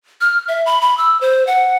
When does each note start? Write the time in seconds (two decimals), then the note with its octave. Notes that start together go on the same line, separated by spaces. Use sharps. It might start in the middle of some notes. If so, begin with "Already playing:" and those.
0.21 F6
0.48 E5
0.66 B5
0.81 B5
0.98 E6
1.21 C5
1.47 F#5